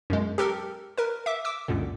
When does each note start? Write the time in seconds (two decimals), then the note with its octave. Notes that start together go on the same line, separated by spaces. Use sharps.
0.10 F#2 B2 G#3
0.38 G4 A4 A#4
0.98 A#4 B4
1.26 E5 D6
1.45 D6 E6
1.68 C#2 F#2 A#2 D3